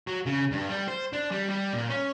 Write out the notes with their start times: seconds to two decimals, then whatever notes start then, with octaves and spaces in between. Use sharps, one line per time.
0.07 F#3
0.26 C#3
0.51 G2
0.69 G3
0.88 C5
1.13 D4
1.32 G3
1.50 G3
1.73 A#2
1.90 C#4